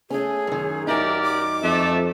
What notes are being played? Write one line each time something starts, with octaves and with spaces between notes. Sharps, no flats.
A3 C#4 G#4
F#2 D#3
F#2 D#4 G4 A#4 D5 E5
D6
F2 A3 E5 A5